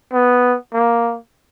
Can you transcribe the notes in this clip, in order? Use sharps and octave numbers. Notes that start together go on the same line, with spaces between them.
B3
A#3